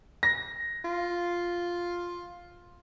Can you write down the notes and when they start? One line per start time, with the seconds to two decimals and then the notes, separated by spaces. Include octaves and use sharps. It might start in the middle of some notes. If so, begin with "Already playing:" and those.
0.23 A#6
0.85 F4